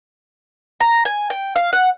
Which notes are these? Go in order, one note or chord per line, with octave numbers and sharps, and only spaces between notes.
A#5
G#5
G5
F5
F#5